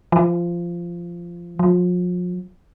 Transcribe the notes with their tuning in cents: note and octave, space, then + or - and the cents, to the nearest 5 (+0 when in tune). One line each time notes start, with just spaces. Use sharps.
F3 -15
F3 +40